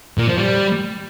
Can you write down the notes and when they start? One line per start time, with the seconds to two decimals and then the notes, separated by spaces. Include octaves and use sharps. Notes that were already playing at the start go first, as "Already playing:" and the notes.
0.18 A#2
0.28 F3
0.38 G3